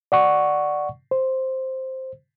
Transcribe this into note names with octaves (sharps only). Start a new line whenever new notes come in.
D5 F#5 C#6
C5